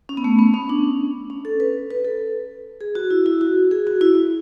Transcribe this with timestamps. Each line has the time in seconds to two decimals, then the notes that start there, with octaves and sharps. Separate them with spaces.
0.09 C#4
0.17 B3
0.24 A3
0.39 B3
0.54 C#4
0.69 D4
1.30 C#4
1.45 A4
1.60 B4
1.91 B4
2.05 A4
2.81 G#4
2.95 F#4
3.11 E4
3.26 E4
3.41 F#4
3.71 G#4
3.87 F#4
4.01 E4